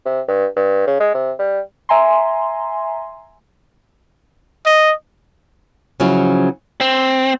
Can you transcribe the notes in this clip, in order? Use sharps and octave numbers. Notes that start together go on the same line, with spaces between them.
C3
G2
G2
C#3
G#3
C3
G3
E5 G#5 A#5 C6
D#5
C#3 F3 F#3 C#4 E4
C4